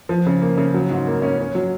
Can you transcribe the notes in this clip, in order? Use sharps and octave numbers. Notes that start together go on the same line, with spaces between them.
F3
C#3
A#3
C#3
F#3
G#2
A#3
C#4
C#4
F#3